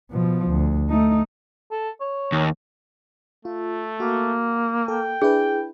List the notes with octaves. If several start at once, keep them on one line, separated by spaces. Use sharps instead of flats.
B2 F3
D2
A3 D#4
A4
C#5
D#2
A3 F4
A#3 F#4
A4 G5
D4 E4 G#4 B4